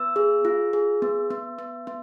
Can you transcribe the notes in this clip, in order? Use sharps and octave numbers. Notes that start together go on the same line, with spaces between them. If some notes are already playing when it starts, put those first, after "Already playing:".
Already playing: B3 E6
G#4
F4
G#4
B3
B3
B3
B3